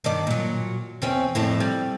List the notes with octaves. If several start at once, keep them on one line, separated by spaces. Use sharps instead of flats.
G2 D#3 D5
A#2 F#3
E2 C4 C#4
F2 A2 E4
G3